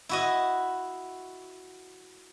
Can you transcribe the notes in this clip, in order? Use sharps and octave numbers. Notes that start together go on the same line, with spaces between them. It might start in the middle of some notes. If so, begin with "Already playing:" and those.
E4 F#4 D#5